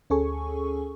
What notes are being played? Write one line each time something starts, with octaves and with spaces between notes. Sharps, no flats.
D2 C#4 G#4 A4 G#5 C#6